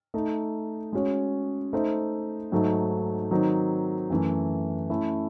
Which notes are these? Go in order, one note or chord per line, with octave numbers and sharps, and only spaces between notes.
A3 D#4 A4
G#3 C#4 F#4 C#5
A3 D#4 A4 C5 E5
G#2 F#3 A3 D#4 A4
D#3 F#3 C4 D#4
F#2 E3 A3
A3 C#4 E4